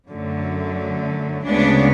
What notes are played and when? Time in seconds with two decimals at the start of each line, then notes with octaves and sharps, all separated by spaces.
0.11 F#2 D3 F#3 A3
1.45 D2 C#3 G#3 B3 D4